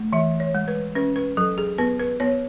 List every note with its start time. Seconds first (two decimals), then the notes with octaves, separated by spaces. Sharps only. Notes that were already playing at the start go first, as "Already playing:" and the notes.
Already playing: A3
0.13 E3 E5
0.40 C#5
0.55 G#3
0.68 B4
0.95 C#4 B4
1.16 B4
1.37 F#3 A4
1.58 G#4
1.78 B3 B4
2.00 B4
2.20 B3 C#5